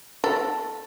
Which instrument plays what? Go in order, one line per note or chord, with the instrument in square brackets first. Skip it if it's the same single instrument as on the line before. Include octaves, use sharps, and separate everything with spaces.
[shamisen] A4